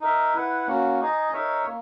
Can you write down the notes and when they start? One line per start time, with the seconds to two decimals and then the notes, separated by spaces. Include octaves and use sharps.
0.01 D#4 A#4 E5
0.34 E4 B4 F#5
0.67 A#3 C#4 F#4
1.01 D#4 G#4 D#5
1.33 D#4 A#4 C#5 E5
1.66 A#3